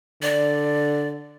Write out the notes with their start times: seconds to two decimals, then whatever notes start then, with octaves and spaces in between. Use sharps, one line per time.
0.22 D3 D5